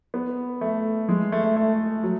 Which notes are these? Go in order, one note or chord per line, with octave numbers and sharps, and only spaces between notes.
B3
A3
G#3
A3
A3
A3
F#3